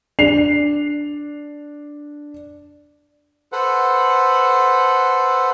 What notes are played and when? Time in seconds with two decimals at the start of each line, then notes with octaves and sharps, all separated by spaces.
0.19 D4 C7 F7
3.52 A4 B4 C5 F#5